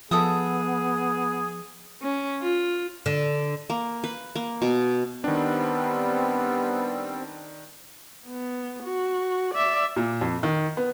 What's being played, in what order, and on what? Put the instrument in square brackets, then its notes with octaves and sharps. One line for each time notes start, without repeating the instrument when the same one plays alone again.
[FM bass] F3 [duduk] B3 [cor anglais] G#4 [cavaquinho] A4 E5 D#6
[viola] C#4
F4
[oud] D3
[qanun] A#3
B4
A#3
B2
[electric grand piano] D#3 D4 [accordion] G3 C4 [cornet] B3
[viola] B3
F#4
D5 E5
[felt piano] A#2
F2
D#3
B3